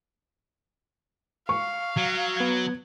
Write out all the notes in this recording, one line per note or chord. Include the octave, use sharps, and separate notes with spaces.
F5 C#6
F#3
B3 G#6